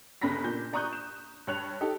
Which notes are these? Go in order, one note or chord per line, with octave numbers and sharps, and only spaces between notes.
G1 C#3 B5 A#6 B6
A#2 D4 G6
D5 A#5 C#6 D#6 F#6 G6
E7
G2 C#5 F#6 F7
D#4 G4 A4